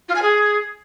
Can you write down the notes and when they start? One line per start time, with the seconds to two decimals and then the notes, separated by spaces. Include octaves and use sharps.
0.09 F4
0.15 G#5
0.22 G#4